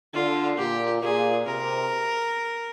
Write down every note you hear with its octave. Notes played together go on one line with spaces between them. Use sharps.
D3 F4
A#2 G4
A#2 G#4
C3 A#4